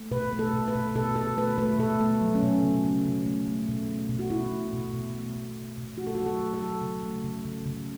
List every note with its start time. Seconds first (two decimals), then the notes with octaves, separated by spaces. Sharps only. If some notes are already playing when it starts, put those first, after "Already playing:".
Already playing: A3
0.11 B2 B4
0.33 A3
0.39 A4
0.54 B2
0.68 B4
0.75 B2
0.95 B2 A4
1.16 B2 A4
1.37 A3 B4
1.58 A3 B4
1.79 B2 A4
2.00 A3
2.21 F#3
2.35 C#4
2.43 B2
2.63 C#3
2.84 C#3
3.05 C#3
3.26 A3
3.47 A3
3.68 B2
3.89 A3
4.09 B2
4.19 F#4
4.30 B2 E4
4.52 A3
4.73 B2
4.93 B2
5.15 A3
5.36 B2
5.56 B2
5.78 B2
5.98 A3 F#4
6.07 A4
6.15 F#3 F#4
6.26 A4
6.40 A3
6.54 A4
6.61 F#3
6.81 C#3
7.03 A3
7.24 C#3
7.45 C#3
7.66 C#3